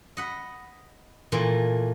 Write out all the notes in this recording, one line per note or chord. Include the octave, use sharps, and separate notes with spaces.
D#5 F#5 B5
A#2 E3 A3 A#3